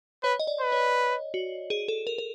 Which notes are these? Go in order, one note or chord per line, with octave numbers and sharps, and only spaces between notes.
B4 C#5
D#5
D5
B4
C#5
F#4
G#4
A4
A#4
A#4